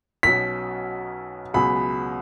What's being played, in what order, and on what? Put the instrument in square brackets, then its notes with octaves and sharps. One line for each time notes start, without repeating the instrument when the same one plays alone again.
[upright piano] B1 B2 F#3 C#4 [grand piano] B6
[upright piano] C#2 B2 F#3 B3 G#4 [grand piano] B5